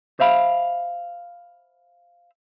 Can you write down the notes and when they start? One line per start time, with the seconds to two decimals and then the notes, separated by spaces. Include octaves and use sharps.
0.20 C5 E5 F5 B5